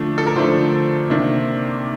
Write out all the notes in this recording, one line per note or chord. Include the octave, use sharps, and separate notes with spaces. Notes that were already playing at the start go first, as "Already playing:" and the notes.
Already playing: D3 F3 A3 D4
A4
A#4
D3 F3 A3 D4 C5
C3 D#3 A#3 D4